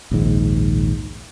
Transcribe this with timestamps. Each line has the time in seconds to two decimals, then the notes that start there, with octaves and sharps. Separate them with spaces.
0.11 A#1 D#2 G#2